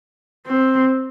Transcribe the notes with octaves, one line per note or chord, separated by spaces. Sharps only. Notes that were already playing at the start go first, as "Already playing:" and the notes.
C4